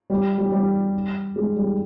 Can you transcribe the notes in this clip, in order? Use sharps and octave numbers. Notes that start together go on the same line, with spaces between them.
G3
G3
G3
G#3
G3